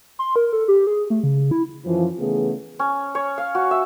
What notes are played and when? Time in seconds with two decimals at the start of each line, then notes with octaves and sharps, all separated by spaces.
0.19 C6
0.36 A#4
0.53 A4
0.68 G4
0.87 G#4
1.10 A3
1.23 C#3
1.51 E4
1.86 F#2 E3 F3
2.19 C#3 E3 A3 B3 G#4
2.79 C#4
3.15 C#5
3.38 F5
3.55 F#4
3.71 E5